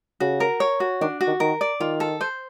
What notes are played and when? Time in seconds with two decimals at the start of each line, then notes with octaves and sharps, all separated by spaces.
0.20 C#3 F#4
0.40 A#4
0.60 C#5
0.80 F#4
1.01 D#3 D4
1.21 F#4
1.27 D#3
1.40 D#3 A#4
1.61 D5
1.80 D#3 F4
2.00 A4
2.21 C5